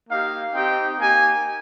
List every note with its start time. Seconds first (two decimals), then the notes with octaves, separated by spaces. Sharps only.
0.09 A#3 D#4 G4 F5
0.55 C4 D#4 G4 G5
0.99 A#3 D#4 G4 G#5